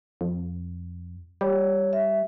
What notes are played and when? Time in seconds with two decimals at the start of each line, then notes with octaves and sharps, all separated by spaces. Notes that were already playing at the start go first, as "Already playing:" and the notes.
0.21 F2
1.41 G3 C#5
1.93 E5